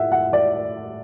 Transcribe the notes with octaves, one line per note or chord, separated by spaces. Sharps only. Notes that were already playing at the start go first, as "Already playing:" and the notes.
Already playing: A2 E5 F#5
F#5
D5